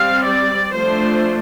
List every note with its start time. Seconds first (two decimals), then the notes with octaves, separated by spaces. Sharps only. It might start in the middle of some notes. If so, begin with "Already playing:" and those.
Already playing: G3 C4 F5
0.25 D5
0.74 F3 A3 D4 C5